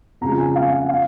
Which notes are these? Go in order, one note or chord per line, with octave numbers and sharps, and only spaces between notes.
F2 C#3 G#3 A#5
G#5
F5
F#5
F5